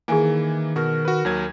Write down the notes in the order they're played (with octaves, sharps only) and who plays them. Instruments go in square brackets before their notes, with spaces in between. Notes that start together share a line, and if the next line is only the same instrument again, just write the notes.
[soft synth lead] D#3 [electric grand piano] E3 A#3 [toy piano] G#4 G#5
[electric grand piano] B2 F#4 [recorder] A#4
[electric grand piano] F#4 B4
D#2 F#3 G#6